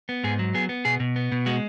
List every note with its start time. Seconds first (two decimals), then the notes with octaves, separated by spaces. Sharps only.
0.09 B3
0.24 G#2 G#4
0.39 F#3
0.54 B3 G#4
0.69 B3
0.85 B2 G#4
1.00 B2
1.16 B3
1.32 B2
1.46 G#3 F#4